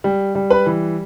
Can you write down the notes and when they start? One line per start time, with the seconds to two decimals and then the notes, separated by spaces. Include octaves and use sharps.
0.04 G3
0.35 G3
0.50 B4 B5
0.66 E3